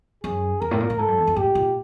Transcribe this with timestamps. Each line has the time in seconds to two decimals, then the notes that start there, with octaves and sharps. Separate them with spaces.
0.24 F#2 G#4
0.61 F2 A#4
0.71 A2
0.80 A#2
0.90 A2
0.99 G#2 A4
1.08 F#2
1.18 E2
1.27 F2
1.36 A2 G4
1.55 A#2